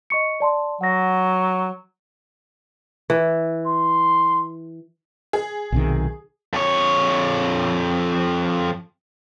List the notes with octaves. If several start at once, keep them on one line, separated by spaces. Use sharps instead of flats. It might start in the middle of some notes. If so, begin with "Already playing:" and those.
D#5 C#6 C#7
D5 A5 C6
F#3 F#5 A#6
E3
C6
G#4
B1 C3 D#3
F2 C#5